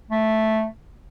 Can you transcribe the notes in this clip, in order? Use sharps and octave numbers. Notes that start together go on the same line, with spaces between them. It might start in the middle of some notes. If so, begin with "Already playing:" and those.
A3